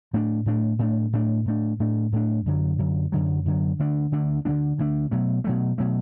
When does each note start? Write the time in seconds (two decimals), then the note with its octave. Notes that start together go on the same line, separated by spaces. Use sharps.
0.13 A2 A3 D4
0.46 A2 A3 D4
0.79 A2 A3 D4
1.13 A2 A3 D4
1.46 A2 A3 D4
1.80 A2 A3 D4
2.12 A2 A3 D4
2.46 F#2 D3 F#3
2.79 F#2 D3 F#3
3.12 F#2 D3 F#3
3.45 F#2 D3 F#3
3.79 D2 D3 A3 D4
4.12 D2 D3 A3 D4
4.45 D2 D3 A3 D4
4.78 D2 D3 A3 D4
5.11 B2 F#3 A3
5.44 B2 F#3 A3
5.78 B2 F#3 A3